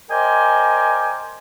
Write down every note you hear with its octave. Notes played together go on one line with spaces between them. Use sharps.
A#4 C5 D5 D#5 G5 G#5